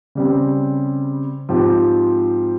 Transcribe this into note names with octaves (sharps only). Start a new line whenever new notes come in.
C#3 G3 C4
G#2 F3 C4 G4